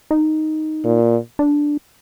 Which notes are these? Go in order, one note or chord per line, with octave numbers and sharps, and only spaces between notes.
D#4
A#2
D4